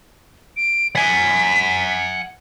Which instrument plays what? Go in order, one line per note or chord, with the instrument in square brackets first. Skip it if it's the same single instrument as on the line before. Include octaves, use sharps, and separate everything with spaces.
[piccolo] D7
[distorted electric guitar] F#5 G#5 [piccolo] B6